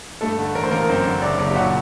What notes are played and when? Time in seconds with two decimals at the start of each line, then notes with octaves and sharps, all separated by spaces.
0.21 G2 A3 A4
0.38 D3
0.54 A1 A#4
0.64 C5
0.71 A1 A#3 A#4
0.88 F#2 C4 C5
1.06 D3
1.22 F#1 D4 D5
1.39 F#1
1.49 G4
1.56 A#2 F#3 F#4